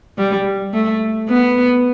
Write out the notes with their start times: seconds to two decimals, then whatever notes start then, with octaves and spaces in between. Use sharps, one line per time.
0.18 G3
0.73 A3
1.29 B3